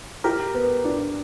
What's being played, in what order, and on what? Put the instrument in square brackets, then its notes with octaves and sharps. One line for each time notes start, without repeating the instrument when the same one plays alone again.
[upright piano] G4 [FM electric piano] A#4
[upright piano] B3
D4